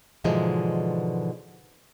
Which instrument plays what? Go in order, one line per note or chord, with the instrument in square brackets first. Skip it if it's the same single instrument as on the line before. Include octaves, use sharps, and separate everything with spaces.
[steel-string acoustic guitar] G#2 B2 D3 E3 F3 G#3